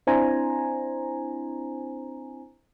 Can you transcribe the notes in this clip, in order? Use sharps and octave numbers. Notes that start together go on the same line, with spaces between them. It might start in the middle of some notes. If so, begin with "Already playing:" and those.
C4 D4 E4 C5 G#5 A#5